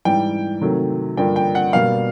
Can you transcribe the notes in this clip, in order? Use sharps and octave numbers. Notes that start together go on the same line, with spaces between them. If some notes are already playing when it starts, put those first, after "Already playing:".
G#2 E3 G3 G5
C3 D#3 F#3 A3
G2 D3 F3 A#3 D4 G5
G5
F#5
B2 G3 A#3 D4 F5